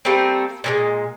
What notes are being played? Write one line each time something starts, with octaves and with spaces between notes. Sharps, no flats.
G3 A3 A#3 C4
A#2 D3 G#3